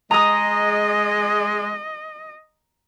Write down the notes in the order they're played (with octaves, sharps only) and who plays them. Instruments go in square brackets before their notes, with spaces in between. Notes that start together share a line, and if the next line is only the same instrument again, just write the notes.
[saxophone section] G#3 [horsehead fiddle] D#5 [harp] A#5 D#6